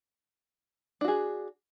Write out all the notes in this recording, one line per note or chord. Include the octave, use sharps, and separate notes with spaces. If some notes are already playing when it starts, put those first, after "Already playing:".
D4 F#4 G#4